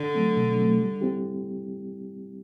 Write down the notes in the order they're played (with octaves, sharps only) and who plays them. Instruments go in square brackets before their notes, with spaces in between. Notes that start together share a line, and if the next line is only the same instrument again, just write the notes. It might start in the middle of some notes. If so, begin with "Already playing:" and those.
Already playing: [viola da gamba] D3
[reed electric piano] F#3 A3 C4
B2
F#3 A3 C4
G3
C4 E4 G4